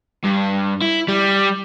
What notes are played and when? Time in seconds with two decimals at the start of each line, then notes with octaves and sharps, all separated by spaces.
0.24 G2
0.82 E4
1.08 G3